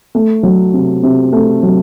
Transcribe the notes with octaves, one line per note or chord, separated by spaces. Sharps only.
A3
F#3
C3
C3
A3
F#3